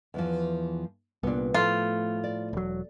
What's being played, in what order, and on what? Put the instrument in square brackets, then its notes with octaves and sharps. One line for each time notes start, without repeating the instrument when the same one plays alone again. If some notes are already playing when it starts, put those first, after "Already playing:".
[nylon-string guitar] E2 E3 F3
[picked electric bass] C2 A#2 [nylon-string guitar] B3 D4
[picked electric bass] A2 F3 [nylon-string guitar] A3 [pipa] F4
[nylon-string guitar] D5
[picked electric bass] E1 F#3